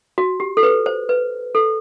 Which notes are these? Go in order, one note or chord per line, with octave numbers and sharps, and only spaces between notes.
F#4
G4
A4
B4
C5
B4
A4